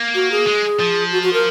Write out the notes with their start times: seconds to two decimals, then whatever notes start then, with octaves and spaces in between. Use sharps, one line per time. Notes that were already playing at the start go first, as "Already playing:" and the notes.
Already playing: A#3
0.15 F#4
0.32 G#4
0.47 G#3
0.80 F3
1.12 F#4
1.23 F#4
1.33 A#4